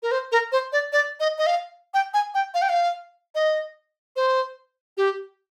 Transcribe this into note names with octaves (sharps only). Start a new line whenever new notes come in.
A#4
C5
A#4
C5
D5
D5
D#5
D#5
F5
G5
G#5
G5
F5
G5
F5
D#5
C5
G4